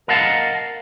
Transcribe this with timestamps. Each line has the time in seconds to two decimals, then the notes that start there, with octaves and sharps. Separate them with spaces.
0.08 A#4 D#5 F5 F#5 A5